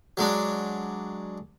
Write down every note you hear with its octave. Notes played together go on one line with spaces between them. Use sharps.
F#3 G#3 D4